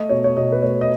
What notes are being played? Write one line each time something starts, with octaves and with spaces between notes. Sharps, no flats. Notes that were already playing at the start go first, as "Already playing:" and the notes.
Already playing: A3 D#5
B2 C#5
C#5
B2 D#5
B4
A3 C#5
D#5